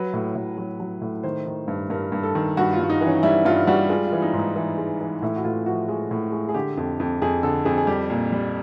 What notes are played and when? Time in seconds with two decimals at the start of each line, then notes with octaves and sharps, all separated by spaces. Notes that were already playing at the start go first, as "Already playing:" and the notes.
Already playing: F#3 B4
0.13 A2
0.36 A2
0.58 F#3
0.80 F#3
1.01 A2
1.23 D#3 C5
1.46 D#3
1.68 G2
1.90 G2 A#4
2.12 G2
2.23 A4
2.35 D#3
2.57 G2 F#4
2.73 F4
2.79 G2
2.90 D#4
3.01 E3 C#4
3.23 G3 E4
3.45 G2 F4
3.67 G3 F#4
3.89 G#3 F4
4.07 F4
4.12 E3
4.22 D#4
4.33 G#2
4.39 D#4
4.56 E3
4.78 G#3
5.00 E3
5.22 A2 E4
5.36 F#4
5.44 A2 F4
5.66 F3 F#4
5.89 G#3
6.11 A2
6.32 G#3
6.49 G#4
6.54 D3 G4
6.77 F2
7.00 F2
7.22 F2 G#4
7.43 D3 A4
7.65 F2 G#4
7.77 G#4
7.87 G3 G4
8.10 A#2
8.32 G3